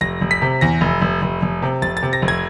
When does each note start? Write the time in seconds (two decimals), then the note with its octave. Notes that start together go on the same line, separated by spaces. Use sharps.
0.01 F1 A#6
0.21 F1
0.31 B6
0.42 C3
0.61 E2 A#6
0.81 F1
1.02 F1
1.22 F1
1.42 F1
1.62 C3
1.82 F1 A6
1.97 A6
2.03 C3
2.13 A#6
2.22 F1
2.28 G#6